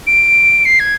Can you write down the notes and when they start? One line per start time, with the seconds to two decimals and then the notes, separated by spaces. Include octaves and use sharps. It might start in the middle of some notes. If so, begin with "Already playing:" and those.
0.07 D7
0.65 C7
0.80 G#6